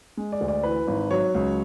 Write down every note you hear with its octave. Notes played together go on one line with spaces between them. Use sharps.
G#3
D5
D2
D5
E3 B4
G#1
F#3 C#5
C#2